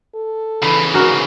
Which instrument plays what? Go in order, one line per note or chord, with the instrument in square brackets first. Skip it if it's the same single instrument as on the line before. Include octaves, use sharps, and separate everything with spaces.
[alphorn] A4
[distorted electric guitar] C#3 E3 [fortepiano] B5
[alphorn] G#2 [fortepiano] F#4 A#4